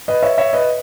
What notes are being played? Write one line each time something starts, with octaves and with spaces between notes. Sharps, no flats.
B4 D#5
C#5 E5
C#5 E5
B4 D#5